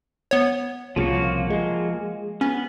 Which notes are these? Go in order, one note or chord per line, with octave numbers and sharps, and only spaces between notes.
B3 C#5
C2 A#2 C#3 F3 A#3 F#4
G#3
B3 C#4